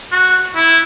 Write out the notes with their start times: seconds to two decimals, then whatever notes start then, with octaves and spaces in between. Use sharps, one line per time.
0.11 F#4
0.56 E4